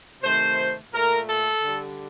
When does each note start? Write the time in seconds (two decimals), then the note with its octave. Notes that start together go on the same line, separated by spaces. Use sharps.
0.22 C3 D#3 A3 C5
0.92 A#2 A3 A#4
1.28 A4
1.63 D3 G3